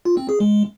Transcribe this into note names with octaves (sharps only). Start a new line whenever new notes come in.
F4
C4
G#4
G#3